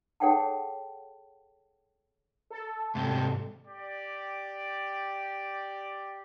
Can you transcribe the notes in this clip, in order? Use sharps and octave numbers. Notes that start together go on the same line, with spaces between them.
G#4 A4 C#5 F#5 G5 A5
A4
G#2 C3 G3
G4 D5